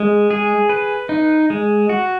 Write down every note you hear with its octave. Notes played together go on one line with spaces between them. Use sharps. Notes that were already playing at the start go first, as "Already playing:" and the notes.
Already playing: G#3
G#4
B4
D#4
G#3
F#4